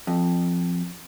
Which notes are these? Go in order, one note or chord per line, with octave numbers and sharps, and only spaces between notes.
F2